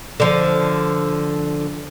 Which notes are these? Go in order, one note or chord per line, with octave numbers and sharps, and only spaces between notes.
D3 F3